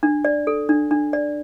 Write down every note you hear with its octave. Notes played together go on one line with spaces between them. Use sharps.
D4
D5
A4
D4
D4
D5